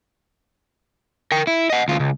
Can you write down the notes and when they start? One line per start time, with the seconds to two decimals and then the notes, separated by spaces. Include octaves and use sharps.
1.32 A#4 G5
1.47 E4
1.70 D#5 F#5
1.88 D2 F4
2.00 C#2